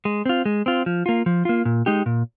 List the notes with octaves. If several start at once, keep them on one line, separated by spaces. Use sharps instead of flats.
G#3
C4 F4
G#3
C4 F4
F3
A#3 F4
F3
A#3 F4
A#2
G#3 D#4 G4
A#2